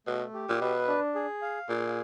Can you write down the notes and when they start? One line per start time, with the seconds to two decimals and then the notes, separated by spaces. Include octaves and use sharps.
0.07 B2 A3
0.34 G4
0.49 A#2
0.61 B2 B4
0.88 D4
1.15 G#4
1.42 F5
1.69 A#2 G#4